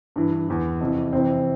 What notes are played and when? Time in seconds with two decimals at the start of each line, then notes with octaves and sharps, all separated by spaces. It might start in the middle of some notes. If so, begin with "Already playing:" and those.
0.16 G2 E3
0.48 E2 E3
0.80 F2 C3 E3
1.12 F2 C3 E3 C4